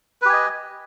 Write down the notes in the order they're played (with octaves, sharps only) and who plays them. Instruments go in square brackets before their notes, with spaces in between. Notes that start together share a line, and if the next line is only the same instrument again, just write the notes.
[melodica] B4
G4
G#5
D#5